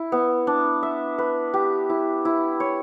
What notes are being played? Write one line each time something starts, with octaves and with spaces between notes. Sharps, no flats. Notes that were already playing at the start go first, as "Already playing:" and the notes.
Already playing: E4
B3
D4
E5
B4
G4
E4
E4
C#5